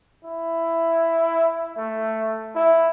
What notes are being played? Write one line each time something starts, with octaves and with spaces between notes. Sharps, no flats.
E4
A3
E4